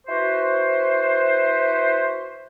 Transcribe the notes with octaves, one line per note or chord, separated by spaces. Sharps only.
E4 F#4 B4 C5